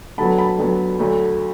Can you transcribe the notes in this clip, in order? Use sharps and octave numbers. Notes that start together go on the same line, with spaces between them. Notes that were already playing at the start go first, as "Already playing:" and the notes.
D2 D3 F#3 B3 A5 B5
A5 B5
D2 D3 F#3 B3
D2 D3 F#3 A3